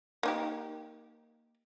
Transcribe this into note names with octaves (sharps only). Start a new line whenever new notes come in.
A#3 D#4 G4